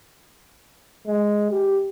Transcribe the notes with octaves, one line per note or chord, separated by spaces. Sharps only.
G#3
G4